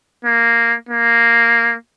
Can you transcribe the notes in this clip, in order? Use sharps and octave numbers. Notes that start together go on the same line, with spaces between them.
A#3
A#3